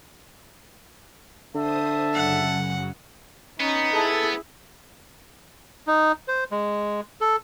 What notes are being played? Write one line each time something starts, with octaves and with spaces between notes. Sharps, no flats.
D3 C5 E5 A5 D#6
F#2 C#3 F#3 F#5
B3 C#4 D#4
E4 G#4 A4
D#4
C5
G#3
A4